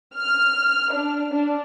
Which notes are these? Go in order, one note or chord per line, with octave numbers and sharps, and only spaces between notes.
F6
D4
D4